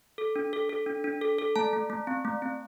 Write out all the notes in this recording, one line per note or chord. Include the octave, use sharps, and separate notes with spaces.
A4
D4
A4
A4
D4
D4
A4
A4
A3 A5
A3
A3
C4
A3
C4